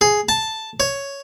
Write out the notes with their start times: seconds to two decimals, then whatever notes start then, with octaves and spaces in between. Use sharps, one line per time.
0.01 G#4
0.29 A5
0.80 C#5